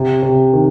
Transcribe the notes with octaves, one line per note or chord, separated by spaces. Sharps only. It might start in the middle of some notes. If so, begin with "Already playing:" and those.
Already playing: C3
C3
D#3